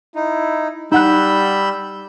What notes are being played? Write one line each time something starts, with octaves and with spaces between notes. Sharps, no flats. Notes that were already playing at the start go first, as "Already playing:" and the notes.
D#4 E4
G3 D#4 F#5 B5 E6 F#6 G6